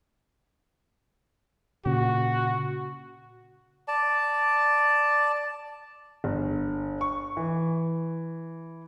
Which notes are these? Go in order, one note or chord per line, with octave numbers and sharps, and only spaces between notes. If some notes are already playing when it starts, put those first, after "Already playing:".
A#2 C#3 F#4
D5 A5
G1
C#6
E3